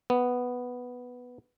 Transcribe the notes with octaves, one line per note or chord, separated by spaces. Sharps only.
B3